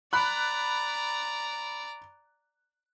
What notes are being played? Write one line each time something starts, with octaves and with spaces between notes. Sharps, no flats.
D5 A#5 B5 F#6